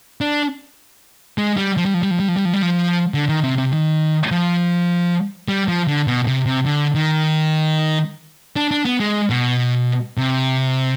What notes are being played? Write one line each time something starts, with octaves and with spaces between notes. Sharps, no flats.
D4
G#3
G3
F3
G3
F3
G3
F3
G3
F3
G3
F3
G3
F3
D3
D#3
C3
C3
D#3
F3
G3
F3
D3
B2
C3
C3
D3
D#3
D4
D4
B3
G#3
B2
C3